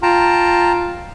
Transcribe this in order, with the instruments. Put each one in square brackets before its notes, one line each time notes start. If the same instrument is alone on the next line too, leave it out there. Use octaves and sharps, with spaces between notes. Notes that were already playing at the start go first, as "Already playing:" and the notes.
[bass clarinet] F4 [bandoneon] G5 A5 A#5